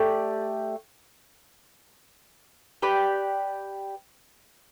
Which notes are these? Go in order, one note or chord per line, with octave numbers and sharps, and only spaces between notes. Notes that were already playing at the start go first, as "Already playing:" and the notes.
Already playing: A3 G4 D5
G4 B4 D5